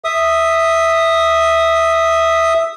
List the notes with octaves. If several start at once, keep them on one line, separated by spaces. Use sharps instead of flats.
E5 D#6